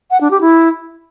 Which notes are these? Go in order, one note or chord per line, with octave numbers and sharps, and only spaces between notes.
F#5
D4
G4
E4